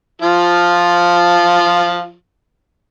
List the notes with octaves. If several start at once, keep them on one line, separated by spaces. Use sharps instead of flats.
F3 F4